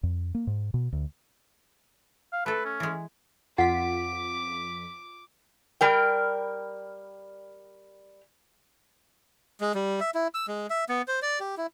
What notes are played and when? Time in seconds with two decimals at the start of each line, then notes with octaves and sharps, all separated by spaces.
0.03 F2
0.35 A#3
0.47 G#2
0.74 B2
0.93 D2
2.33 F5
2.46 A3 A4 B4
2.65 C#4
2.80 E3 G#3
3.58 F2 F4 F#5 D6 B6
5.81 G3 A#4 G5
9.61 G#3
9.75 G3
10.00 E5
10.14 E4
10.34 E6
10.48 G#3
10.70 E5
10.89 B3
11.08 C5
11.22 D5
11.40 G4
11.57 E4